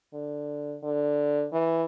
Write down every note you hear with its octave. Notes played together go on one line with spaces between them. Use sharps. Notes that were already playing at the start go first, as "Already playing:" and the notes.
D3
D3
E3